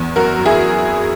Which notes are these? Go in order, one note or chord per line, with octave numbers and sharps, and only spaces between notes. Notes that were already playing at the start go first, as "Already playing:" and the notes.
Already playing: E2
F#2 F#4 A#4
F#2
E4 G#4